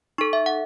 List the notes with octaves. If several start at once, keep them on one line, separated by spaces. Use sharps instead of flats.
D#4 A4 C#6
E5
F#5